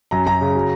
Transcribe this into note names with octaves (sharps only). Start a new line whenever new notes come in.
F#2 A#5
F#2 A#5
C#3
F#3